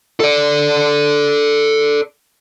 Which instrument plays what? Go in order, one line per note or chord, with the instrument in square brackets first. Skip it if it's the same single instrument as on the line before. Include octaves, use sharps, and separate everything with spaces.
[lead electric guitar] A4 D5